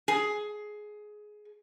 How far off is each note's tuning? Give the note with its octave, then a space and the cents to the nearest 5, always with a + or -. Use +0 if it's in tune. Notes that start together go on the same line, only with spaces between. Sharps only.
G#4 +15